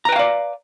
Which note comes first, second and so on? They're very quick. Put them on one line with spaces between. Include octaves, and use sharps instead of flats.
A#5 B4 G5 F5 D5